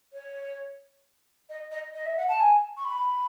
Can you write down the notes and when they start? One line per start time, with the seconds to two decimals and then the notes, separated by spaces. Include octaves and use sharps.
0.13 C#5
1.49 D#5
1.71 D#5
1.94 D#5
2.05 E5
2.17 F#5
2.28 A5
2.40 G#5
2.76 C#6
2.84 B5